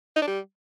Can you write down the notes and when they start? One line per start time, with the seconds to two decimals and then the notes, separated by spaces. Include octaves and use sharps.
0.16 D#4
0.22 D4
0.27 G3